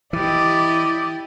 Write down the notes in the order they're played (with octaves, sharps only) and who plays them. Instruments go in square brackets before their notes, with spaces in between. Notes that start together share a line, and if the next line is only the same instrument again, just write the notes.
[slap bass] E3 [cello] E4 [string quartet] G4 D#5 [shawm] D5